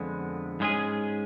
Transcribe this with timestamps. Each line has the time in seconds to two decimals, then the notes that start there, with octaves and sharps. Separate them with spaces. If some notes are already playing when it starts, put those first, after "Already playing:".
Already playing: F2 D3 F3 G#3 B3
0.60 G#2 G#3 C#4 G#4